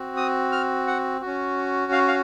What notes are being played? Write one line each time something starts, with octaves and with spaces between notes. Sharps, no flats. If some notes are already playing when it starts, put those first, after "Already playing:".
Already playing: C4 F#4
D#6
F6
F#5
C#4 F#4
F5
F5